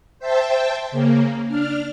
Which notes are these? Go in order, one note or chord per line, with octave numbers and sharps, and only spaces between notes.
C5 E5 G5 A5
C#3 A#3
D4 F6